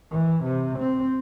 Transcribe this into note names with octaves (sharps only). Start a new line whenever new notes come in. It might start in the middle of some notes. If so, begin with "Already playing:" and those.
E3
C3
C4